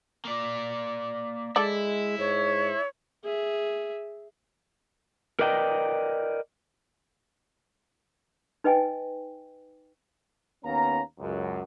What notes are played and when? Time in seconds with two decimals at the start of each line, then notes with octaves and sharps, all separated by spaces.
0.25 A#3 D5
1.56 G#3 E4 A4 D5
2.19 G#2 C#5
3.24 G#4 E5
5.39 A#4 B4 D5 D#5 G5
8.64 D#4 B4 D#5 G5 G#5
10.64 D#2 B3 C#4 F5 A#5
11.20 C#2 F#2